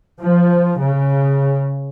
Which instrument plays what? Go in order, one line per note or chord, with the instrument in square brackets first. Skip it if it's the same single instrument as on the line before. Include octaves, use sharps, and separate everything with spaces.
[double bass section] F3
C#3